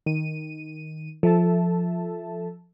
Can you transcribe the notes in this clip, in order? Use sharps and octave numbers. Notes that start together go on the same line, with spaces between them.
D#3 D#7
F3 A4 E5 A5